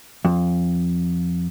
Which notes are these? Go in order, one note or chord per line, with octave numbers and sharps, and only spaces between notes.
F2